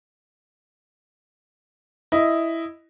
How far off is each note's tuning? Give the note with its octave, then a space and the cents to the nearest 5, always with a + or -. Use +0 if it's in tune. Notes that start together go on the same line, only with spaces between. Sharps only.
E4 +0 D#5 +0